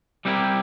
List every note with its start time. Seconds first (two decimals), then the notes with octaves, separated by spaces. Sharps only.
0.25 G3 C4 E4 G4 A#4